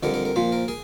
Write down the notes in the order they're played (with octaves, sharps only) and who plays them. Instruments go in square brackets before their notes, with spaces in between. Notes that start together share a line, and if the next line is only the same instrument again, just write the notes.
[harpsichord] F2 D3 G3 A#4
A#4
A#4
A#2 F3 C5
A#4
G#4